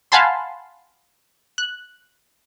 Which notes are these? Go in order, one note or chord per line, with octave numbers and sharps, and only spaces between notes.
F5 F#5 G#5 A5 B5 C6
F#6